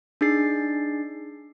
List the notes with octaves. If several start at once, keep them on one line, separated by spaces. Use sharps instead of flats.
D4 D#4 G#4 A6 C7